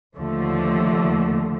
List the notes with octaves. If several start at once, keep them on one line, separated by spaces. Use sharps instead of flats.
D#2 D3 F3 A3